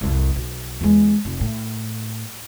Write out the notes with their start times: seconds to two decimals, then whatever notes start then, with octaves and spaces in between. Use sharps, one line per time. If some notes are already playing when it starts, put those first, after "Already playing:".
0.01 C2 F2
0.36 B1
0.81 E2 G#3
1.25 F1
1.41 A2